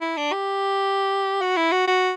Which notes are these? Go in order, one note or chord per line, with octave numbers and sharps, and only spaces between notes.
E4
D4
G4
F#4
E4
F#4
F#4